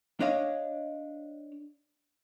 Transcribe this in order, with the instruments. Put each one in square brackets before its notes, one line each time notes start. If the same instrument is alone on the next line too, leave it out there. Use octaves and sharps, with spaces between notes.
[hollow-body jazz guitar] D4 C#5 D#5 F5